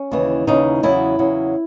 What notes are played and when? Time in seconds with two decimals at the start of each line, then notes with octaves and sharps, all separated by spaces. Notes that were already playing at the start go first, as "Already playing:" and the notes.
Already playing: C#4
0.11 D#2 C#3 E3
0.47 D#2 C#3 E3 D#4
0.83 E2 C#3 F#3 E4
1.19 E2 C#3 F#3